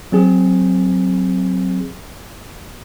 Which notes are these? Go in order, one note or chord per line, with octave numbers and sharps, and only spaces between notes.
F#3 C4 G#4